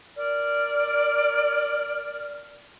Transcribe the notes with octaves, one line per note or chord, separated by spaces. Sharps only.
A#4 D5 F6